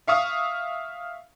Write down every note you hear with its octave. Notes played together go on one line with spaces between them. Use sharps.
E5 F5 C#6 D#6